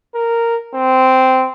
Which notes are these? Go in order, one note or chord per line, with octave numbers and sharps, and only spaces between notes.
A#4
C4